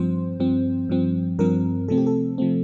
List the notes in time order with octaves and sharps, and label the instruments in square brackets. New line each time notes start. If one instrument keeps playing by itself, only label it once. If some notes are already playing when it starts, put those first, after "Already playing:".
Already playing: [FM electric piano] G2 F3 C4 C5
G2 F3 C4
G2 F3 C4
G2 F3 C4 A#4
C3 F3 A3 C4 A4
G4
A4
C3 F3 A3 C4